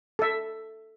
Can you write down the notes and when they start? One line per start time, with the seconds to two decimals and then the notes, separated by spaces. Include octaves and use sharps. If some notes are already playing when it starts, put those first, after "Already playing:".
0.19 A4 E5